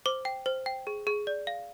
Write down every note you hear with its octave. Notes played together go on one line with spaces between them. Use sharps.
C5 D6
G5
C5
G5
G#4
G#4
D5
F5